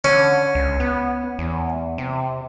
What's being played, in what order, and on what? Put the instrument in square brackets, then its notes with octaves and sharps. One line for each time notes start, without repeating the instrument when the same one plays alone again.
[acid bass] D3 [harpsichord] C#4
[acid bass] C#2
B3
E2
C3